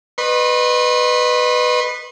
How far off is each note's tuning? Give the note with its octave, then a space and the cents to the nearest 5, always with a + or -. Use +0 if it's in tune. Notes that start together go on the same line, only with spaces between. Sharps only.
B4 +0 D#5 -30 C6 +45